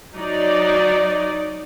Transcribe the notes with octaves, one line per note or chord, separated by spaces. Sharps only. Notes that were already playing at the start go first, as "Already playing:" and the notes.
F#3 D#4 D5